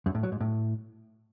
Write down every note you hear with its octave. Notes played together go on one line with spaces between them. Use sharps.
F#2
A2
F#3
G#2
A2